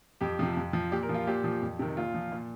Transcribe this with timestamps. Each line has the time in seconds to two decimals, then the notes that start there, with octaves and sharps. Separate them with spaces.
0.21 F2 G4
0.39 C3 F3
0.57 F2
0.73 F3
0.92 A#2 G4
1.03 A#4
1.09 F3
1.14 F4
1.27 A#2 G4
1.44 F3
1.62 F2
1.79 C3 D#3
1.97 A#2 F4
2.14 F3
2.32 A#2